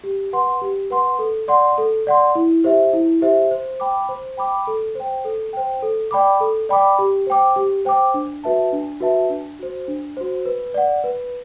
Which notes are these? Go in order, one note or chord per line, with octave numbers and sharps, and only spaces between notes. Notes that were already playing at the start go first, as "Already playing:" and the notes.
G4
B4 F#5 C6
G4
B4 F#5 C6
A4
D5 F#5 C6
A4
D5 F#5 C6
E4
G4 C5 E5
E4
G4 C5 E5
C5
G5 B5 D6
C5
G5 B5 D6
A4
C5 G5
A4
C5 G5
A4
D5 G5 B5 D6
A4
D5 G5 B5 D6
G4
C5 G5 D6
G4
C5 G5 D6
D4
F#4 B4 E5 A5
D4
F#4 B4 E5 A5
D4
F#4 C5
D4
F#4 C5
B4
D5 F#5
B4